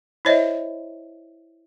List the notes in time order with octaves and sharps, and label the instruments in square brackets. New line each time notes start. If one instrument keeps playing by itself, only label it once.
[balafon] E4 C5 C#5 D#5 E5